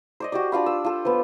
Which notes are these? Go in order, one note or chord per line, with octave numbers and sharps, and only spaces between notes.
C5 D5 D#5
F#4 G4 D5
D4 F4 F5 B5
E6
F4 A4
F3 B3